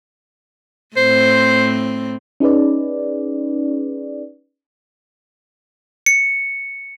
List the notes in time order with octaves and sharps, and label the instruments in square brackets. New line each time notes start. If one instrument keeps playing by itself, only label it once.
[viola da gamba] A2 C4 [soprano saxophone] C5
[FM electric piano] C#4 D#4 G#4 B4 D5
[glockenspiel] C#7